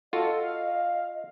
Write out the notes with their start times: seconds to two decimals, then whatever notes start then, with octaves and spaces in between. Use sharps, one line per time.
0.13 F4 F#4 A4 D#5
0.43 F5